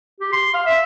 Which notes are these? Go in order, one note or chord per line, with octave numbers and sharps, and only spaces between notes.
G4
C6
F5
E5